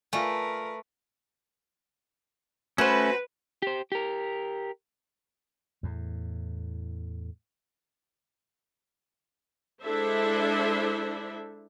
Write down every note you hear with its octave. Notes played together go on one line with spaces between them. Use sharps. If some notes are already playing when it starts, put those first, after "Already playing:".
A3 F4 A#4 B4 D5 G#5
A3 C#4 F#4 B4 C5
G4 C5
G4 A#4
E2 A2
G#3 D4 E4 A4 C5 E5